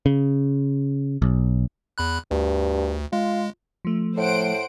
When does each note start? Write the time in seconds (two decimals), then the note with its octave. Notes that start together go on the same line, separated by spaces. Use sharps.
0.06 C#3
1.22 B1
1.98 E2 B5 F#6
2.31 D2 G2
3.13 G#3 F4
3.85 F3 A3
4.17 A2 C5 F#5 D7